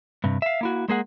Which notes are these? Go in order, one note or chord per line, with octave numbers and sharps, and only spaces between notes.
G2 C3
E5 F5
A#3 E4 F#4
G#3 A#3 G#4 F#5